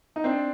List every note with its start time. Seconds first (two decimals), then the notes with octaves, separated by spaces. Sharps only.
0.16 D#4
0.24 C4 D4